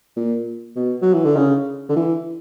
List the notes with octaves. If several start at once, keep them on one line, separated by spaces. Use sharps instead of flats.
A#2
B2
F#3
E3
D3
C#3
D3
E3